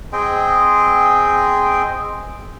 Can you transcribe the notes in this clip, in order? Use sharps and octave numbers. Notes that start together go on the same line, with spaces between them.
C4 G#4 D#5 G5